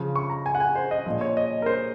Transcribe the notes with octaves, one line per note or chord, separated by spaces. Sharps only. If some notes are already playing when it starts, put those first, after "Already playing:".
Already playing: C#3 F3
C#6
A#5
G#5
F#5
G#5
C5
D#5
A#2 F3 D#5
C#5
D#5
A#4
C5